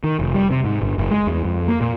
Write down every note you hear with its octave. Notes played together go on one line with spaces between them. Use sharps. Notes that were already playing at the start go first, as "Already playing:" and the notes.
D#3
F1
G3
C3
G#2
G1
F#1
G#3
E2
F2
A#3
A#2